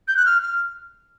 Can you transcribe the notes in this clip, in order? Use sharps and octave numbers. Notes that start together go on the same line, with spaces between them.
G6
F#6
F6
F6